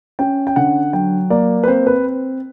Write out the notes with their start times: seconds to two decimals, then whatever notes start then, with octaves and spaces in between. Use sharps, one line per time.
0.19 C#4 G5
0.47 G5
0.56 D3 F#5
0.93 F#3 G5
1.30 A#3 D5
1.63 B4
1.67 C4 C5
1.87 B4